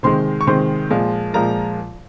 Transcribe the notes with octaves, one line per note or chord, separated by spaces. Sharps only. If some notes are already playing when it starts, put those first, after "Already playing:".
C3 D#3 G#3 C5 C6
C#6
C3 D#3 G#3 C5 C6
A#2 F3 G#3
A#2 F3 G#3 A#4 A#5